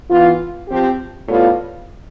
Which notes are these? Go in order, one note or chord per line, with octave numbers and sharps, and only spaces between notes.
E3 B3 F4
F3 C4 G4
A2 G3 B3 F4